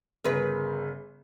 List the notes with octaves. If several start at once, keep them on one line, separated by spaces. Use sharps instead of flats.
G1 C#3 A#4 B4